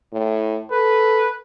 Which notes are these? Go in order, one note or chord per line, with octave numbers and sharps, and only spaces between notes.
A2
A4 B4